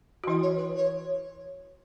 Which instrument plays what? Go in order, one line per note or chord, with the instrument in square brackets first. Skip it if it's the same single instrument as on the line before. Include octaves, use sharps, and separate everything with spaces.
[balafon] F#4
[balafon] E3 E4 [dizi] D#5
[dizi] C#5
B4
C#5